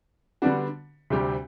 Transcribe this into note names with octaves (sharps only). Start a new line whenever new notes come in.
D3 G3 B3 D4 F#4
D2 C3 G3 C4 G4